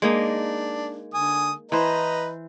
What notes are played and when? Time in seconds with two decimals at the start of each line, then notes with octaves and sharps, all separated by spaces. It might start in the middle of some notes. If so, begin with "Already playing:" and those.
0.02 G#3 A#3 D4 D#4
1.14 D3 G#5 D#6
1.72 E3 B4 C5 D#5 A#5